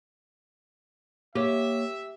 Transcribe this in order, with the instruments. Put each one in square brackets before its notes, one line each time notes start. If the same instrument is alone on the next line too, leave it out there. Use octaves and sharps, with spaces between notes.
[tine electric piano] A#3 C#5 [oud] G4 [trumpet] E5